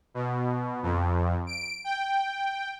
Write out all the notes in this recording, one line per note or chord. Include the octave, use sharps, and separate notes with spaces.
B2
F2
D7
G5